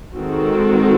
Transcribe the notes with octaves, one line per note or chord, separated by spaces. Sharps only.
D#3 G#3 C4 F#4 A4